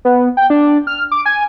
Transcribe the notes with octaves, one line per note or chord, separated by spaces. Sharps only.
B3
G5
D4
F6
D6
G#5